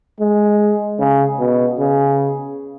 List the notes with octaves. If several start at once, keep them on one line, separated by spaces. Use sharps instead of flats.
G#3
C#3
B2
C#3